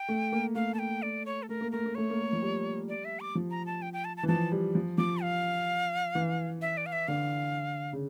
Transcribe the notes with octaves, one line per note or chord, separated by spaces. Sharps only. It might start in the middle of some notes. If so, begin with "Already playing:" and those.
Already playing: G5
A3
A#3
A3 F5
A5
G5
D5
C#5
A4
A3 A#4
A#3
A3 A#4
A#3
A3 C#5
A#3
A3
F3
G3
D5
E5
D6
F3
A#5
A5
G5
G5
A5
A5
E3
F3 A5
G3
F3
F3 D6
F5
E3
E5
D5
F5
E5
D3 F5
C#3